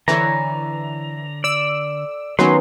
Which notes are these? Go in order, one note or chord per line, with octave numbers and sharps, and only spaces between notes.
D3 E3 C5 C#5 E5 A#5
D5 E6
D#3 F#3 B3 C#4 B4 C6